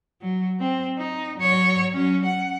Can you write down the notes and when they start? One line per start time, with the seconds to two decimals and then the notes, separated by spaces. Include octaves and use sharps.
0.21 F#3
0.60 C4
0.99 D#4
1.38 F#3 C#5
1.93 F#3 C#4
2.26 F#5